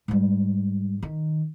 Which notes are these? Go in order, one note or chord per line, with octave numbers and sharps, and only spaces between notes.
G#2 G3
D#3